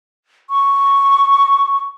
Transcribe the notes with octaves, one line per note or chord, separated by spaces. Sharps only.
C#6